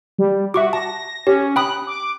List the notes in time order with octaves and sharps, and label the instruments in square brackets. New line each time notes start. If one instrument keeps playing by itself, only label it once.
[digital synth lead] G3
[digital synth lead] F#4 [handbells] E5 C#6 D6
[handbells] A5 [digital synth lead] A#6
[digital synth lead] C#4 [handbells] G4
[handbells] G5 B5 D#6 [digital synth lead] F#6
[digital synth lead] D6